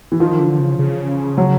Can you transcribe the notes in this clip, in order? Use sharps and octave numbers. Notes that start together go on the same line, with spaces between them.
E3
D#3 F3
D3
C#3
C#3
F#3